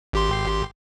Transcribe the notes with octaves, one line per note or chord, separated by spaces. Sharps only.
G#1 G4 C6